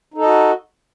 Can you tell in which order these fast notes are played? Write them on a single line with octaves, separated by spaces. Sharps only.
D#4 A4 D#5 F#4